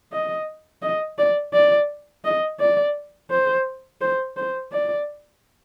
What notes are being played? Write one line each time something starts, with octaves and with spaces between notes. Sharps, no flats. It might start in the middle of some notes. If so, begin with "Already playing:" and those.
D#5
D#5
D5
D5
D#5
D5
C5
C5
C5
D5